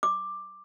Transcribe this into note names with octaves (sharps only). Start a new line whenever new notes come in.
D6